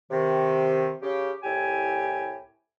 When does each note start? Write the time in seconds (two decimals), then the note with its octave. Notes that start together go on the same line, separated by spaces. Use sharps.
0.10 C3 D#3
1.02 C#3 G4
1.43 C2 A2 G4 G#5